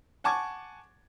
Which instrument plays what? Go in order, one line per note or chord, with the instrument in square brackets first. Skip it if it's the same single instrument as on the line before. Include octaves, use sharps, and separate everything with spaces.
[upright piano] F#5 G#5 A5 C#6 D6 G#6